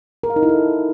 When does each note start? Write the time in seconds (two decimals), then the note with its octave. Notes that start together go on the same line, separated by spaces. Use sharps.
0.23 A#4
0.30 F5
0.36 D#4
0.43 E4
0.49 A4